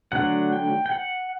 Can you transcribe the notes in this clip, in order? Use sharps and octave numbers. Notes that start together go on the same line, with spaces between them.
D3 F#3 A3 D4 F#5
G5
G5
F#5